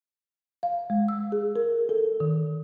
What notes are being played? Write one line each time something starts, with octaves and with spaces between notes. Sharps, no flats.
F5
G#3
E6
G#4
A#4
A4
D#3